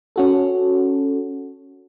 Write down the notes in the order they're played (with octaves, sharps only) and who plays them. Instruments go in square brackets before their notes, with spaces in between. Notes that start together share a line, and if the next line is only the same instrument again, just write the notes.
[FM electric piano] C#4 F#4 A4